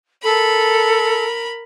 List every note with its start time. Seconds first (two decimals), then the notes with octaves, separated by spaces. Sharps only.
0.23 A4 A#4 B5